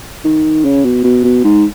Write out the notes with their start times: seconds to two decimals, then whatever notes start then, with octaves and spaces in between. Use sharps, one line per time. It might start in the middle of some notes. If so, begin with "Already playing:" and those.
0.25 D#3
0.65 C#3
0.84 B2
1.04 B2
1.24 B2
1.44 G#2